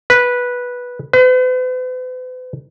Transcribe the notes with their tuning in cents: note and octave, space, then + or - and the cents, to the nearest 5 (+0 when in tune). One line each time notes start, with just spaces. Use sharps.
B4 -10
B4 +45